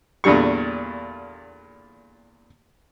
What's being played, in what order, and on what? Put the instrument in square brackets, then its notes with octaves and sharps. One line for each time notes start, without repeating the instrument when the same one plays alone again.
[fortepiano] E2 A#2 D3 G3 C#6